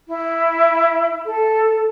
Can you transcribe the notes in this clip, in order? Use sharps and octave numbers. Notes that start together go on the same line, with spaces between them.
E4
A4